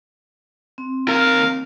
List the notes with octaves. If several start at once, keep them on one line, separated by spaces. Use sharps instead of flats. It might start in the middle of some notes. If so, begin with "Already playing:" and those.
C4
D#2 A#4 F5